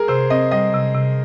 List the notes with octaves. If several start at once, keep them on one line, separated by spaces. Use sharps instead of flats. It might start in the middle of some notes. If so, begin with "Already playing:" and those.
Already playing: G#4 A#4
C3 C5
C4 D#5
G3 D#5
C3
C3